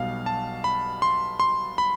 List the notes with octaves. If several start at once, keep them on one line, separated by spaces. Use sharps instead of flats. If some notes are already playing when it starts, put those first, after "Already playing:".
Already playing: B1 B2 G3 F5
A5
B5
C6
C6
B5